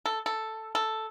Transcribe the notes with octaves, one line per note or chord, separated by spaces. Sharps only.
A4
A4
A4